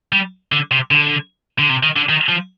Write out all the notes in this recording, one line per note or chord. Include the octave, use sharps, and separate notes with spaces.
G3
D3
C3
D3
D3
C3
D#3
D3
D#3
F3